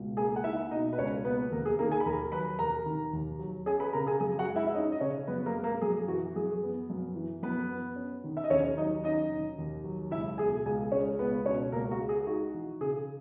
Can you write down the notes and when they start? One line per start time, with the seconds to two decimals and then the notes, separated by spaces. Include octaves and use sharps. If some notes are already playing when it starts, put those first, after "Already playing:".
Already playing: C#2 B2
0.17 A#3 G#4 G#5
0.36 F#5
0.44 D#4 E4 E5
0.71 B2 D#4 D#5
0.93 B4
0.98 C#2 C#4 C#5
1.25 A#3 B3 B4
1.51 D#2 A#3 A#4
1.66 G#4
1.79 D#3 A#3 A#4
1.92 G#4 G#5
2.00 B5
2.06 D#2 A#4 A#5
2.32 F#3 B4 B5
2.59 D#2 A#4 A#5
2.86 D#3
3.13 D#2
3.39 F#3
3.66 C#4 G#4 G#5
3.80 B4 B5
3.93 C#3 A#4 A#5
4.07 G#4 G#5
4.20 F#2 G#4 G#5
4.39 F#4 F#5
4.48 G#3
4.56 E4 E5
4.67 E5
4.74 C#4 D#4 D#5
4.92 D#5
5.01 C#3 C#4 C#5
5.27 F#2 B3 B4
5.46 A#3 A#4
5.54 G#3
5.64 A#3 A#4
5.82 F#2 G#4
6.08 E3 F#4
6.36 F#2 G#4
6.63 B3
6.90 F#2
7.16 E3
7.43 F#2 B3 B4
7.70 B3
7.96 C#4
8.24 D#3
8.37 E5
8.44 D#5
8.50 D#2 C#4 C#5
8.77 F#3 D#4 D#5
9.04 C#4 D#4 D#5
9.30 D#3
9.58 D#2
9.84 F#3
10.11 C#2 E4 E5
10.38 B2 G#4 G#5
10.66 C#2 G#4 G#5
10.92 G#3 C#4 C#5
11.19 C#2 B3 B4
11.46 B2 C#4 C#5
11.72 C#2 A#3 A#4
11.91 F#4
12.00 G#3
12.09 G#4
12.27 D#4 F#4
12.54 E3
12.80 C#3 G#4